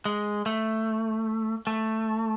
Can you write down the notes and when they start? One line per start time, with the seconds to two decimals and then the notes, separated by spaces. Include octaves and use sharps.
0.05 G#3
0.46 A3
1.67 A3